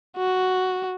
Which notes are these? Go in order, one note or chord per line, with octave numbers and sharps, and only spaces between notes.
F#4